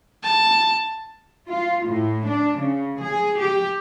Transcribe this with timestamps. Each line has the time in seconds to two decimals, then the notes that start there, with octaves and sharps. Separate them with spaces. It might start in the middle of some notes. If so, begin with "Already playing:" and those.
0.24 A5
1.49 F4
1.86 A2
2.28 D4
2.57 C#3
3.02 G#4
3.40 G4